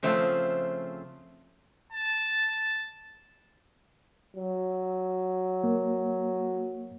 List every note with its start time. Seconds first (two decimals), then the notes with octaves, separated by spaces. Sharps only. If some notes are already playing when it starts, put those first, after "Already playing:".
0.03 C#3 F3 A3 C4
1.92 A5
4.36 F#3
5.64 A#3